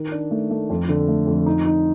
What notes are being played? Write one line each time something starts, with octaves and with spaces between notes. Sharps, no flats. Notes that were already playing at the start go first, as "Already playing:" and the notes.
Already playing: D#3
D4
A3
A3
F2
D3
A3
F2
D#4
D#4